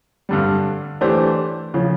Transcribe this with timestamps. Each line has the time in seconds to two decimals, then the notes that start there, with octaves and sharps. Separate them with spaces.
0.29 G2 D3 G3
1.01 E3 A3 D4 G4 C5
1.74 C#3 F3